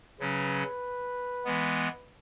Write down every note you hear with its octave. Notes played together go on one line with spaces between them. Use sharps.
C#3 F#3 C#4 B4
E3 G#3 B3